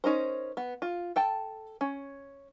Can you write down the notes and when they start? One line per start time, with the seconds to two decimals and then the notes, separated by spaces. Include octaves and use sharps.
0.04 C#4 D#4 A#4 C5
0.57 B3
0.82 F4
1.16 A4 G5 A5
1.81 C#4